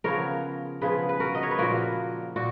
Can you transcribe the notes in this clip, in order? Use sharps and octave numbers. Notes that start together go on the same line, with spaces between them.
C#3 F3 B3 A#4 C#5
C#3 F3 B3 G#4 B4
B4
F#4 A#4
D#5
C#5
B4
A#2 F3 A#3 F#4 A#4
A#2 F#4